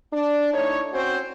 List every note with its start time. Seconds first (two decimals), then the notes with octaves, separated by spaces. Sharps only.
0.12 D4
0.53 A2 D#4 C#5
0.93 C4 C#4 F#4 C5